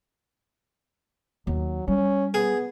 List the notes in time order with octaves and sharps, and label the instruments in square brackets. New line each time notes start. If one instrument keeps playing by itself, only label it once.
[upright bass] D#2 [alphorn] F#3
[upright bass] G3 [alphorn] C#4
[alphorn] B3 [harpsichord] G#4